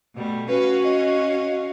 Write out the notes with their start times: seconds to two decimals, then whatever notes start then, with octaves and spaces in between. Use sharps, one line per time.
0.15 B2 G3 A3
0.48 C#4 F#4 B4 C#5 F5
0.84 D#5